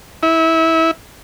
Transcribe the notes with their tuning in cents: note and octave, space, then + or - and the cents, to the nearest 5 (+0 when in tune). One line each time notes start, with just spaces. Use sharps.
E4 -25